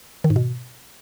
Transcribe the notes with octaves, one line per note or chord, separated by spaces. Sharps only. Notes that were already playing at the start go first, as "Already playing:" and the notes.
D#3
G#2
B2